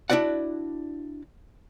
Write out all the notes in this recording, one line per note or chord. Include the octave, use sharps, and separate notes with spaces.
D4 E4 F#4 D5 F#5